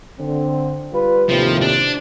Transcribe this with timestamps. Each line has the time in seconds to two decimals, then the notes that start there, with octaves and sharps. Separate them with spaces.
0.19 D3 C4
0.93 G3 F4 B4
1.29 D#2 A2 C3 F3
1.61 D4